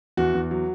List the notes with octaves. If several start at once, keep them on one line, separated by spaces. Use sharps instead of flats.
E2 F#4
E2
F#3